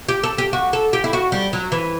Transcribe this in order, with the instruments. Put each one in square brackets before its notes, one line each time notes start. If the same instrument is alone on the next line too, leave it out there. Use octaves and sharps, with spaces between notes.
[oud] G4
A4
G4
F#4
A4
G4
E4
F#4
G3
F#3
E3